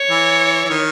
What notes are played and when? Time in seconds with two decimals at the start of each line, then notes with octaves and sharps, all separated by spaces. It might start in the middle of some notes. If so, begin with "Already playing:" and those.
Already playing: C#5
0.10 E3
0.65 E3
0.69 D#3